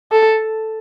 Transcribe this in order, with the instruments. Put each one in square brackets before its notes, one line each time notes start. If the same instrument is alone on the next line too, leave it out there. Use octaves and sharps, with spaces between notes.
[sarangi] A4